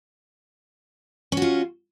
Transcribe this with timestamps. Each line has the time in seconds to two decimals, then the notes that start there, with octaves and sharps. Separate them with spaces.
1.32 C#4
1.37 F#4
1.42 F4